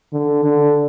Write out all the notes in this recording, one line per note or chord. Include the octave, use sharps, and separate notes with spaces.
D3
D3